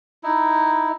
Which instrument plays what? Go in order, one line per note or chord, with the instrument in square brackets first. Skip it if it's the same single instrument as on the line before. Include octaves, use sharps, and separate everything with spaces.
[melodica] D#4 E4